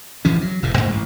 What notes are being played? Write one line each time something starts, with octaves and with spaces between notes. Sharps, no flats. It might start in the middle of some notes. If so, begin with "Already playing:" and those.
D1 E3 F3 C#4
F#3
F1 A2 C3
A1 G2 D3 A#3
A1